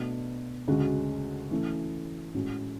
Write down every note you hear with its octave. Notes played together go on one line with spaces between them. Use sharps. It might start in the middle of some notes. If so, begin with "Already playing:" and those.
Already playing: B2 A3 D4 F#4
D2 C#3 G#3 C#4 F#4
E3 A3 C#4
A2 G#3 C#4 F#4